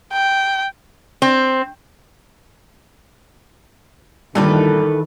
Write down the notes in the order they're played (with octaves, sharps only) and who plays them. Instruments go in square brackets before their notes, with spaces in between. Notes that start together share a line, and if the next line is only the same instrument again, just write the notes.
[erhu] G5
[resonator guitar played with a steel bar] C4
[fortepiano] G2 A#2 [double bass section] D#3 E3 [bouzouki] A3 A4 B4